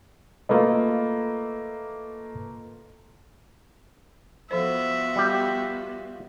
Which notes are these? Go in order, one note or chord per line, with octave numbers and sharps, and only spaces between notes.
A3 A#3 F4 A4 B4 D#5
F3 B3 F4 F#4 A4 C5 E5
G3 G4